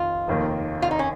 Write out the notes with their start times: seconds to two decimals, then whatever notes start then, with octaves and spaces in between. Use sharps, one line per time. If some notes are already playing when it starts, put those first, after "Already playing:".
Already playing: F1 F2 D#3 F4
0.27 F1 D#2 D#3 A#3
0.82 F4
0.91 D#4
0.99 C#4